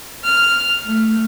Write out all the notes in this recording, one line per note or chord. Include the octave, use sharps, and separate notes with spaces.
F6
A3